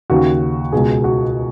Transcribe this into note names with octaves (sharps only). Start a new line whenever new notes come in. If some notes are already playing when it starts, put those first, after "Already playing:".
D#2 C#3 F#4
C#2 B2 G#4
F#4